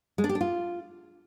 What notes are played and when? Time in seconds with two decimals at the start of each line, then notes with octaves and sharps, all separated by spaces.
0.18 G#3
0.24 D4
0.29 G4
0.35 D4
0.41 F4